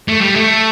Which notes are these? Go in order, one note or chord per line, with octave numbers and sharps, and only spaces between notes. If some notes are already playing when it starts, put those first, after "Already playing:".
A3
G3
A3